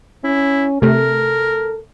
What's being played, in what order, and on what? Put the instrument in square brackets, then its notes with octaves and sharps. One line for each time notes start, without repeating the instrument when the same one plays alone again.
[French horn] C#4 [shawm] E4
[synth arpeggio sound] C3 A3 [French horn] A4 [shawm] A#4